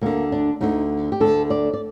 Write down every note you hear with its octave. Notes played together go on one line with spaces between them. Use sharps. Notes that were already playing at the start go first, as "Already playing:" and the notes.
D2 D3 A#3
D4
D2 D3 D#4
G4
D2 D3 A4
D5
D5